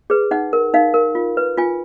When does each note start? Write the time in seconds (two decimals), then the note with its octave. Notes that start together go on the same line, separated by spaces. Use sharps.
0.10 G#4 B4
0.31 D#4 F#5
0.53 A#4
0.74 D#4 F5
0.94 A#4
1.15 F4
1.37 B4
1.57 F4 G#5